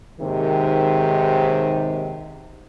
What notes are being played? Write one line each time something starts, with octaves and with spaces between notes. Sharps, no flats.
D#2 G#2 C3 D#3